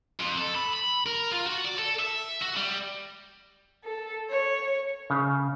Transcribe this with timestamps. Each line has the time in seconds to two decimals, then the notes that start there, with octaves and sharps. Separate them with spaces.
0.20 F2
0.38 A4
0.55 B5
0.73 B5
1.06 A#4
1.32 F4
1.46 F#4
1.64 D5
1.78 A4
1.99 E5
2.42 F#4
2.56 G3
3.84 A4
4.30 C#5
5.10 C#3